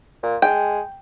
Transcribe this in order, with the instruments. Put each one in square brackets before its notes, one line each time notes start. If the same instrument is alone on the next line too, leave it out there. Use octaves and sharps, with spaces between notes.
[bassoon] A#2
[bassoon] G#3 [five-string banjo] G5